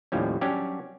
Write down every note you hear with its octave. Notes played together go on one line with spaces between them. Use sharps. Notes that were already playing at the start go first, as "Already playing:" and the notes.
D#2 A2 F3 G3 C#4
F#3 G3 C#4 D4 G4